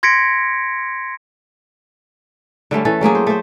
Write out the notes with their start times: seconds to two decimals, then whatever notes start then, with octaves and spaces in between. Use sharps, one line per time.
0.03 C6 G#6 A#6 B6 C#7 D7
2.71 D3 G3 A3 C#4
2.85 E3 C#4 A4
3.01 F#3 A3 A#3 G#4
3.15 C5
3.27 A3 C5